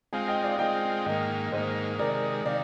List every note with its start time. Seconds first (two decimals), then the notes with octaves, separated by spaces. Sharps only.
0.13 G#3 C4 F4 F5 G#5
0.28 D#5 G5
0.44 D5 F5
0.59 G#3 C4 F4 D#5 G5
1.06 G#2 D#3 A#3 D#5 G5
1.52 G#2 D#3 A#3 C5 D#5
1.99 C3 D#3 G#3 A#4 D5
2.45 C3 D#3 D5 F5